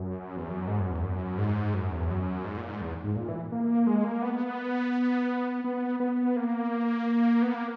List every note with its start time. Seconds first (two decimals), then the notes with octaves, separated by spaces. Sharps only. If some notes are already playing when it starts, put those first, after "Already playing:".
Already playing: F#2
0.37 E2
0.50 F#2
0.68 G#2
0.80 F#2
0.91 E2
1.03 F#2
1.38 G#2
1.74 F#2
1.92 E2
2.10 F#2
2.45 G#2
2.57 A#2
2.69 G#2
2.81 E2
3.04 G#2
3.16 A#2
3.29 E3
3.52 A#3
3.87 G#3
4.04 A#3
4.22 B3
5.64 B3
6.00 B3
6.36 A#3
7.42 B3
7.55 A#3